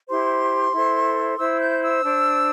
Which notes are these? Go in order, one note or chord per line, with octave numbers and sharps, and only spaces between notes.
E4 G4 C5 C6
E4 A4 C5
E4 C5 E6
G6
E6
D4 C5